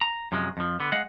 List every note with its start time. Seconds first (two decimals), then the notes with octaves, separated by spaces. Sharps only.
0.01 A#5
0.32 F#2 C3 F3 F#3 G#3
0.57 F2 F3
0.80 D3 B3
0.92 G#3 D#5 F5 F#5